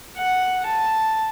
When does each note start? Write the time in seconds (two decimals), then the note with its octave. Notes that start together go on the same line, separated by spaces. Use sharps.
0.18 F#5
0.66 A5